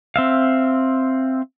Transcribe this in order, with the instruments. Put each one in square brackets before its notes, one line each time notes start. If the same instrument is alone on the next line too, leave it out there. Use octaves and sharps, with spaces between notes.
[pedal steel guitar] C4 E5 F5